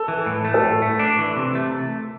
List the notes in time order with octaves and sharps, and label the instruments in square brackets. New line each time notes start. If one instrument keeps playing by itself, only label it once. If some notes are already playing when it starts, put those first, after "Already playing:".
Already playing: [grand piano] A4
[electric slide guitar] E3
A2
A3
[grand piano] A4
[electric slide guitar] A2
A3
D4
E3
C3
A3